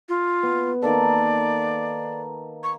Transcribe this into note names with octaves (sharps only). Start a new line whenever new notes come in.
F4
B3
D#3 A#3 A4 D5
C#6